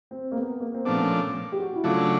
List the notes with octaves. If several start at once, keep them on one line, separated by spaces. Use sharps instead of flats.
C4
A#3
B3
A#3
C4
A#2 F3 A3 B3 D4
C#4
G4
F#4
E4
C#3 F#3 A3 D4 F4